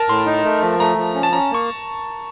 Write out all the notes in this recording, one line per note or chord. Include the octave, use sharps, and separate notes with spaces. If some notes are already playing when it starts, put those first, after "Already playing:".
Already playing: A#4 A5
A2 C6
D#4
A3
F3
A3 A#5
F3
C#4
A5
C#4 A#5
A#3 C#6